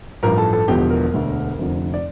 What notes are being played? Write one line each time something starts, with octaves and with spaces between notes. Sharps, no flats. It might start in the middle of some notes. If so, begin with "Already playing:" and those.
A1 G2 F3 A#4 A#5
A4 A5
A4 A5
E1 E2 D3 F3 G4 G5
A#4
E1 D2 D3
F1 F2 D3 F3
D5